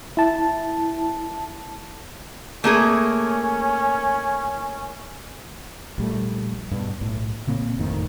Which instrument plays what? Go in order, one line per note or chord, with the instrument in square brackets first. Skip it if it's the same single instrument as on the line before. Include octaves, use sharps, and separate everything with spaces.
[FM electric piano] E4 A5
[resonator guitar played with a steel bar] A3 A#3 G#4 [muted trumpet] C#4
[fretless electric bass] A#1 G3 A3
G2 B2
B1 A2
A#2 C#3 A#3 C4
G1 F2 A2 D#3